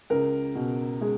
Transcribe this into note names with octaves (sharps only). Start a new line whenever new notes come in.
C#2 A#4
B2
G#3